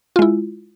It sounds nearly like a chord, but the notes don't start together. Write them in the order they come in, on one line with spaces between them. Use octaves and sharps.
F4 G#3 E4